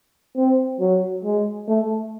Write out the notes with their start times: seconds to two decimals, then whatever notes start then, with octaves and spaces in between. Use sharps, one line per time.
0.37 C4
0.80 F#3
1.24 G#3
1.68 A3